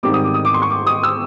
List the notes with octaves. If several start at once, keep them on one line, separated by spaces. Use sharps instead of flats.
G#2 D#3 G3 C4 D6
D#6
D6
D#6
D6
C6
C#6
D6
D#6
E6